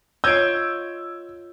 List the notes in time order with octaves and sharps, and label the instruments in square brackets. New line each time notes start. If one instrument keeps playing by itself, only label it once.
[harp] F4 C#5 D#5 [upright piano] E6 D7 [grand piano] G6 G#6